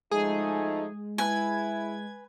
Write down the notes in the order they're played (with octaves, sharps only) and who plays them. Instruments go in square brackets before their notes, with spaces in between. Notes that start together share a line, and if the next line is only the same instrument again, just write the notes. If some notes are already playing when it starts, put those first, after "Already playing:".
[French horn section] F3 A3 D#4 [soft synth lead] G#3 [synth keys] G#4
[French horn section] E4 [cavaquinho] B4 G#5 [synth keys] G#6